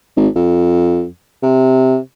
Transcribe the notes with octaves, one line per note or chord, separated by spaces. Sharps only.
G#1
F2
C3